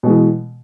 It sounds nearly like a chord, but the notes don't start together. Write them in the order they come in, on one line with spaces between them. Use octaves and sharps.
B2 G#3 E3